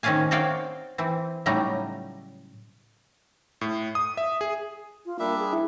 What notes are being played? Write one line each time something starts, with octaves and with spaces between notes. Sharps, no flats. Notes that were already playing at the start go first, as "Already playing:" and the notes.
D#3 C4 C#4 D5 F5 G#5
C4 F#4 C#5 D5 F5 G5
E3 C4
A2 C#3 F#3 G3 D#4 A#5
A2
D#6
E5
G#4
F4
G3 A#3 D4 E5
G#4
E4